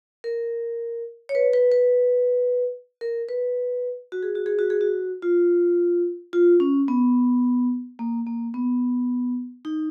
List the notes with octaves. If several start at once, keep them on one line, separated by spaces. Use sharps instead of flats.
A#4
C#5
B4
B4
B4
A#4
B4
F#4
G#4
F#4
G#4
F#4
G#4
F#4
F4
F4
C#4
B3
A#3
A#3
B3
D#4